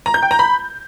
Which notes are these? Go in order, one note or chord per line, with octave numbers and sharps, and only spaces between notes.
A#5
G6
G5
A#5
B5